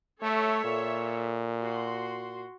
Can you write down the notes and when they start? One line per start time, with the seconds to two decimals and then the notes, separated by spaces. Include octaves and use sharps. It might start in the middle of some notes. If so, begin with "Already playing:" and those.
0.22 A3 A4 C#5 E5
0.64 A#2
1.59 F#4 C6